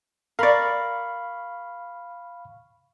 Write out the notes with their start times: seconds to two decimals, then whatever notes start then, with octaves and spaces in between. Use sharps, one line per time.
0.39 A#4 D5 F5 B5 C#6